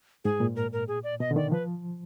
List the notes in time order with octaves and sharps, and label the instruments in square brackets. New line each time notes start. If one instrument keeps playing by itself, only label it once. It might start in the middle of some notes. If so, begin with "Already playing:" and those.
[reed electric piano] G#2 [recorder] G#4
[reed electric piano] A#2
[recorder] A#4
A#4
G#4
D5
[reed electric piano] B2 [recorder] D#5
[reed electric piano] D3
[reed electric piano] D#3 [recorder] D5
[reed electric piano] F3 [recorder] B4